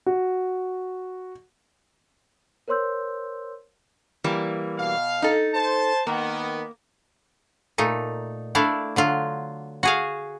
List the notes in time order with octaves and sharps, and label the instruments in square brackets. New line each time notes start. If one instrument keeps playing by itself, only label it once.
[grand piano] F#4
[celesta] A#4 C5 C#5 C6 E6 G6
[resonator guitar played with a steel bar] E3 G3 A#3
[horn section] B2 F5
[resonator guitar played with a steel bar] D#4 A4
[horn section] C5 A5
[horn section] D#3 B3 [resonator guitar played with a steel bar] A#3
[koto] A#2 A3 D#4
A3 D4 E4 F5
D3 F#3 F4
F#4 G#4 F5